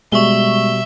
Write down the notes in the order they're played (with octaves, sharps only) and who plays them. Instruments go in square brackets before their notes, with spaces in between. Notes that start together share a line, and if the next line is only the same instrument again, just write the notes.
[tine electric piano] B2 G3 [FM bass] G#3 [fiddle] E5 [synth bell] C#6 G7